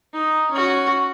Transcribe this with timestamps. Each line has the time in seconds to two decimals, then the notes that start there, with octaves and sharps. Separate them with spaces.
0.13 D#4
0.51 C#4 F#4